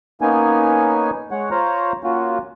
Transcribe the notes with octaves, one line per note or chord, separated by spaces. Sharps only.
A#3 B3 C#4 D#4 G#5
G#3 C#5 F#5
F4 C5 C#5 F5 A#5
A#3 C#4 F4 F#4